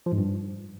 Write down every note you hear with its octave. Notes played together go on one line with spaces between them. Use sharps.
F3
G#2
G2